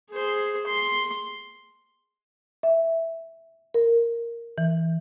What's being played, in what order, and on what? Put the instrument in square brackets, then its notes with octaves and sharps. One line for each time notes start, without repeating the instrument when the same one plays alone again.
[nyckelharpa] G#4 C5
C6
[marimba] E5
A#4
E3